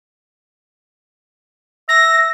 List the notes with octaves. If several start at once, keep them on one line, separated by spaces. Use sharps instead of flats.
E5 A#6